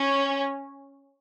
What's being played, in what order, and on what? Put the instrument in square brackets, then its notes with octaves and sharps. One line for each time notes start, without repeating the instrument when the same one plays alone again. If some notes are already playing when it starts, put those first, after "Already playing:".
Already playing: [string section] C#4